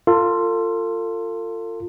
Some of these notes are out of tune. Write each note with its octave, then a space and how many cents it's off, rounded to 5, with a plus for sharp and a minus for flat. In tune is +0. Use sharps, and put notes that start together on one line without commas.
F4 +0 A4 +35